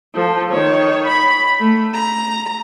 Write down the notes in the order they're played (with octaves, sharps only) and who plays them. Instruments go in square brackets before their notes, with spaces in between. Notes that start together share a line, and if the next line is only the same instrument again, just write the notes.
[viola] F3 A4
D#3 C#5
B5
A3
A#5